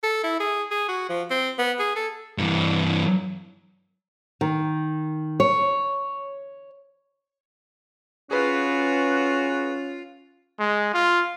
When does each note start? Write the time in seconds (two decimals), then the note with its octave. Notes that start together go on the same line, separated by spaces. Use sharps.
0.03 A4
0.24 E4
0.40 G#4
0.71 G#4
0.89 F#4
1.10 F3
1.31 C4
1.59 B3
1.79 G#4
1.96 A4
2.38 G2 E3
4.41 D#3
5.40 C#5
8.31 C#4 F4 F#4 G#4 B4
10.60 G#3
10.94 F4